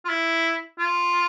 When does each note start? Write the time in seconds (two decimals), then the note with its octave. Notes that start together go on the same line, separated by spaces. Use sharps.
0.05 F4
0.09 E4
0.79 F4